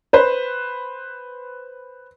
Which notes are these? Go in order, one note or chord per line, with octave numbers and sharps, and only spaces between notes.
B4 C5